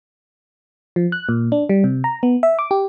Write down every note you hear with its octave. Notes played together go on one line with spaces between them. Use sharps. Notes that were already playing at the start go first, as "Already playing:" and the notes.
F3
F#6
A#2
D4
G3
C3
A#5
B3
E5
D6
G4